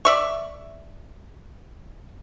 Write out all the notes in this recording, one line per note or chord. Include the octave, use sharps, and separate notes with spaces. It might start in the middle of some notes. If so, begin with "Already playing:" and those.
D5 E5 C#6